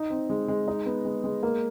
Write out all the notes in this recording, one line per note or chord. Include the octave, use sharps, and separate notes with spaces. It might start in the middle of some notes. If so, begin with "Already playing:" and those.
Already playing: D#4
C4
G#3
G#3
D#4
B3
G#3
G#3
A#3